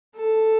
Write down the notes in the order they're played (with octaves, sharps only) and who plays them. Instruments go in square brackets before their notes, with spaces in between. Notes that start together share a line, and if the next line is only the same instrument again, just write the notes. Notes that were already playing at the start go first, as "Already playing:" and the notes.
[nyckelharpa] A4